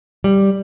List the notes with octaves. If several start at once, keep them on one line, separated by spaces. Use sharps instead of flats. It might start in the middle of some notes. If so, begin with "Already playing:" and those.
G3